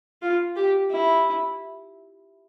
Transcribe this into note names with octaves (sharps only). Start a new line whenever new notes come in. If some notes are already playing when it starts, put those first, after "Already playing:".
F4
G4
E4